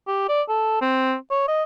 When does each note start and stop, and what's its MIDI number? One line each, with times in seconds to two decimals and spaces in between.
0.08 0.29 67
0.29 0.42 74
0.49 0.81 69
0.82 1.15 60
1.31 1.47 73
1.48 1.63 75